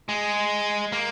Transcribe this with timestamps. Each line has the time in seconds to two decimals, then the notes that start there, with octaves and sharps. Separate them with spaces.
0.09 G#3
0.92 A#3